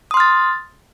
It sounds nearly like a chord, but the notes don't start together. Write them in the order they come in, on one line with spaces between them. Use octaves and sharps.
D#6 C6 F6 A6